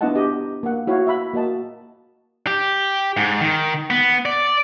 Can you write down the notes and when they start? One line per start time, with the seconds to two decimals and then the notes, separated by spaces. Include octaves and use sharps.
0.01 B3 D4 E4 D#5 F#5 A5
0.15 G4 D#5
0.63 A#3 F#5
0.87 E4 F#4 C#5 F5
1.07 E5 B5
1.33 A#3 F#4 D#5 A5
2.47 G4
3.17 G#2
3.41 D#3
3.90 B3
4.26 D5